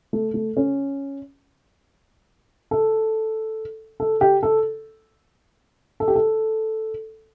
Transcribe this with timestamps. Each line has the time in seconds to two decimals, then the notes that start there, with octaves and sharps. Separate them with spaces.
0.13 A3
0.34 A3
0.57 C#4
2.71 A4
4.00 A4
4.21 G4
4.43 A4
6.00 A4
6.08 G4
6.15 A4